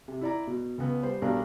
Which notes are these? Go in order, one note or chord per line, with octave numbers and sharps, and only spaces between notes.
C3
E4 D5 A#5
B2
C#2 B3
G3 C5
B1 G3 D4 A#4